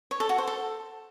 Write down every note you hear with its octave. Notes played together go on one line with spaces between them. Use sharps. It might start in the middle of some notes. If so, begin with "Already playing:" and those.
C#5
A4
F#4
C5
A4